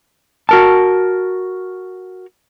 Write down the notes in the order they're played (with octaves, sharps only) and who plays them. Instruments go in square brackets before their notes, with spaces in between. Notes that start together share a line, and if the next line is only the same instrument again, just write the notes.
[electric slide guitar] F#4 A#4 A5